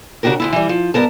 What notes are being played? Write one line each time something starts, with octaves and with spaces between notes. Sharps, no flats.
C#3 D4 F#4 G4 A#4
D2 D3 E4
E3 G3
F3
G2 B3 A#4 A5